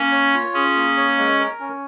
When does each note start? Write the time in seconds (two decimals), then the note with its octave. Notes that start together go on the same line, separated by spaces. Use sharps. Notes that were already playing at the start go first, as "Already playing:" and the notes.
Already playing: A#3 C#4
0.12 C#5
0.34 F4
0.54 C#4 G#4
0.76 A#3
0.97 C#5
1.18 G#3
1.39 A#4
1.60 C#4